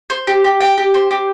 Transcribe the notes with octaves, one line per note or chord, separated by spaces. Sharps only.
C5
G4
G4
G5
G4
C5
G4